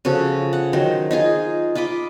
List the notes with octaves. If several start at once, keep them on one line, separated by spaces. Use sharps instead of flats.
C#3 F3 F#4 A4
F#5
D#3 F#3 C5
D#4 F4 G#4
F4 D#5 B5 D6